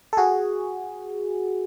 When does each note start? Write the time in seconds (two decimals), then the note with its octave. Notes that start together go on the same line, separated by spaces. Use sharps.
0.13 A4
0.17 F#4 G#4